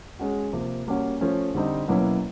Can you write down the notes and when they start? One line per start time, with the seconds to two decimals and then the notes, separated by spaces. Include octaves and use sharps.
0.19 G#3 C#4 F#4
0.53 C3 F3 A#3
0.87 G3 A#3 C#4 F#4
1.21 F3 A3 C#4
1.55 D3 G3 C4 D#4
1.88 B2 F#3 A#3 C#4 E4